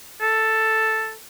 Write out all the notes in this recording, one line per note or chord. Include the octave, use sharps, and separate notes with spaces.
A4